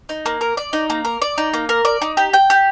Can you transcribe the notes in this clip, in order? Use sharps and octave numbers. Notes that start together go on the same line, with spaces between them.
D#4
A#3
A#4
D5
D#4
A#3
A#4
D5
D#4
A#3
A#4
D5
D#4
G4
G5
G4